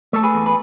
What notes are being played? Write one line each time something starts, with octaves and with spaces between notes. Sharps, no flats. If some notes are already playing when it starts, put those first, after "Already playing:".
A3 A4
G#4 B4
E2
B4